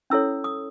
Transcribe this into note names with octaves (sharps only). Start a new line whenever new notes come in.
C#4 E4 A4 C#5 E6
D#6